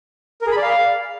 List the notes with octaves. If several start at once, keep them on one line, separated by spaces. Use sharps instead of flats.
A#4
G#4
B5
D5
F5